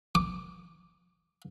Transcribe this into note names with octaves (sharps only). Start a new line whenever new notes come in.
D6